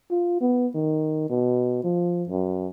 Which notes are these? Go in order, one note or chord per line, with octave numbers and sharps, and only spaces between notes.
F4
B3
D#3
B2
F3
F#2